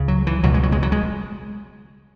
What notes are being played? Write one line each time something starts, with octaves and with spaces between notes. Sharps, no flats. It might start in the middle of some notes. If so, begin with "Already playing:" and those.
Already playing: C#2 C#3
F#3
E3
C#2 B2 F#3
G#3
F#3
G#3
F#3
G#3